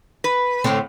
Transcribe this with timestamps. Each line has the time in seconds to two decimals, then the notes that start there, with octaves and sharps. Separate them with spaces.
0.24 B4
0.64 A2 D3 C4